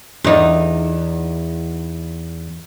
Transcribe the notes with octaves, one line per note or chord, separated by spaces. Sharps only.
E2 D#4